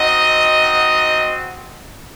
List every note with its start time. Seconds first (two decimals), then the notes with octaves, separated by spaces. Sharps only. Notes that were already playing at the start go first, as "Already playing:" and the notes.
Already playing: C4 D#4 F#4 D#5